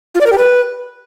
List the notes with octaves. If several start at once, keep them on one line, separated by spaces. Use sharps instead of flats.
F4
D5
A#4
G4
B4